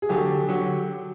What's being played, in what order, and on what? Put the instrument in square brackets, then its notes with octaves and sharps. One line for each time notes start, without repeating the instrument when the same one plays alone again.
[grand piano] G#4
[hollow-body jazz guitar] D2 D3 F#3 [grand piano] G4 A4
[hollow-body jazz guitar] D3 F#3